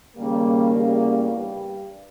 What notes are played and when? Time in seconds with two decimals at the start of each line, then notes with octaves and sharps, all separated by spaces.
0.17 D#2 C#3 G3 A#3
0.73 E2 C#3 G3
1.27 G2 G3